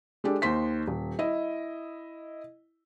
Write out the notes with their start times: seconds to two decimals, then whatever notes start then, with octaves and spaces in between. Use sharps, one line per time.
0.24 G#3 D4 G4 A4
0.42 D#2 D#3 C5 C6 B6
0.87 D#1
1.19 E4 D#5